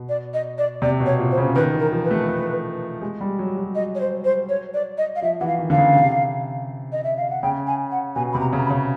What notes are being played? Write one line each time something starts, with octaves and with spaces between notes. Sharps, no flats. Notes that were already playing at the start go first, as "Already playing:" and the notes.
Already playing: B2
D5
D#5
D5
C3 D5
B2
C#5
A#2
C5
C#3
D#3 B4
E3 A#4
F3
B4
A3
A3
G#3
G3
F#3
F#3
D#5
C#5
C5
C5
C#5
D5
D#5
F5
F3 E5
E3 F#5
F5
D#3
D3 F5
C#3
C3
D#5
E5
F5
F#5
C#3 G5
G#5
F#5
B2 G#5
C3 B5
A#5
C#3 A#5
B5
C#3